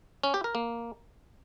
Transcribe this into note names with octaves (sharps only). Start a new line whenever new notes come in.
C#4
G4
A#4
A#3